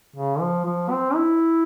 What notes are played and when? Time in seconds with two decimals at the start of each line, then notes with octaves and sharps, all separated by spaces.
0.16 C#3
0.40 F3
0.65 F3
0.91 C4
1.15 E4